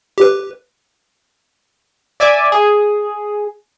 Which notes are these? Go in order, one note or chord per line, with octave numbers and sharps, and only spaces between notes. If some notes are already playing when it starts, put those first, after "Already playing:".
G4 B4
D5 E5 G#5 D6
G#4